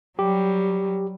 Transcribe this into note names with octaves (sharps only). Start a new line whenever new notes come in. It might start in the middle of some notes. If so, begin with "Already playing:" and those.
F#3 G3 G4